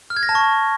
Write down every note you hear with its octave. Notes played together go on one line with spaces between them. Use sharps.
F6
G#6
A#6
A5
C#6